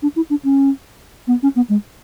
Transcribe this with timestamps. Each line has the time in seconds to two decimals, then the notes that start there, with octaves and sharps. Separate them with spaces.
0.03 D4
0.16 E4
0.30 D4
0.44 C#4
1.28 B3
1.43 C#4
1.56 B3
1.70 G#3